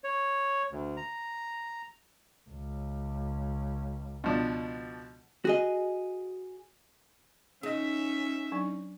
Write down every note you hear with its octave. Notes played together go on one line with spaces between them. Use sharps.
C#5
D2
A#5
C#2
B2 F3 D4
F#4 G#4 D#5
C#4 D#4 G#4 D#5 E5
F#3 D4 D5